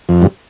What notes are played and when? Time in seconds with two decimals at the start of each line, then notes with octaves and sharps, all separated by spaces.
0.09 F2
0.22 G2